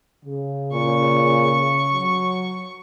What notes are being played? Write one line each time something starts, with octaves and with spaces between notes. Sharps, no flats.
C#3
A#2 C#6
F#3